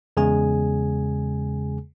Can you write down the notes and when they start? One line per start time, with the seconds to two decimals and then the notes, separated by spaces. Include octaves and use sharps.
0.17 E2 C#3 G#3 G#4 G#5